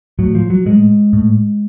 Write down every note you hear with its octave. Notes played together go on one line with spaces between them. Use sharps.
A2 F#3
F3
F#3
A2 G#3
A2